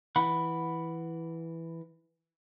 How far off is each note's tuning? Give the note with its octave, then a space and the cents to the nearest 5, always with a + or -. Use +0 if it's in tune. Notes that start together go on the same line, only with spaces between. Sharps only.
E3 +0 F#5 +0 B5 +0